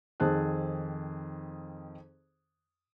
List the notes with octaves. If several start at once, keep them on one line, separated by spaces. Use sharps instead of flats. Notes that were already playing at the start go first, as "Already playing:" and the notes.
F2 D#3 C4 G#4 A5 F#6